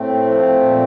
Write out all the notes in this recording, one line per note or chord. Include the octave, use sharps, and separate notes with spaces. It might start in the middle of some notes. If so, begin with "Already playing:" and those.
Already playing: A2 A3 C4
F3
A#2